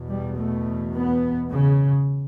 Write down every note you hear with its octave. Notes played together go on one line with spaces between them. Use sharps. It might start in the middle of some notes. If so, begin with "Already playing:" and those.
Already playing: E2 B2
G3
A3
B3
C#3